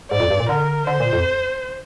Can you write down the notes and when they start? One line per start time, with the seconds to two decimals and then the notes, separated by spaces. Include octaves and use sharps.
0.11 G#2 D5
0.20 F2
0.30 G2
0.40 A#2
0.49 D3 A#4
0.87 D3 C5
1.00 A#2
1.13 F2